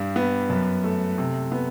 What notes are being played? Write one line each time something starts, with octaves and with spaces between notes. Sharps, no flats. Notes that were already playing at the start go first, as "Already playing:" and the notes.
Already playing: G2 G3
B3
F#2
A3
C3
B3